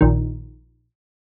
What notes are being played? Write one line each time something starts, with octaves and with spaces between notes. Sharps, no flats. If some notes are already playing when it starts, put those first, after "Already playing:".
A#1 D#3